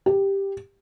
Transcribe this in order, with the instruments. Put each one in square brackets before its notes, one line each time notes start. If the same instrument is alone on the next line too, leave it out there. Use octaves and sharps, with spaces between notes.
[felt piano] G4